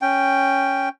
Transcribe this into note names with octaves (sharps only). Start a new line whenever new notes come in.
C#4 G5